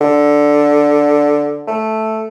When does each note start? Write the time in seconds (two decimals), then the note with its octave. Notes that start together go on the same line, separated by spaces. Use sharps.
0.01 D3
1.67 A3